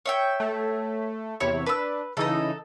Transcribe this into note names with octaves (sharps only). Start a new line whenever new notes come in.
C#5 E5 G5
A3
E2 C3 E4 C#5
D4 B4 E6
C#3 E3 D#4 A4 D#5